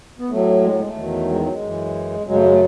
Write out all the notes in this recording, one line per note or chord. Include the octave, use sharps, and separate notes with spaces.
B3
A2 F#3 A3
G#3
F#3
G#3
A3
E2 D#3 F#3
G#3
F#3
G#3
F#2 E3
F#2 C#3 F#3 G#3
A3
G#3
A3